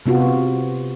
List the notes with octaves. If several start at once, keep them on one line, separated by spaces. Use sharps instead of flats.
C3 B3 F4 F#4